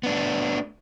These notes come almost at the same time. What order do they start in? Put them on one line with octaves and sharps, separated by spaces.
B3 D4 A3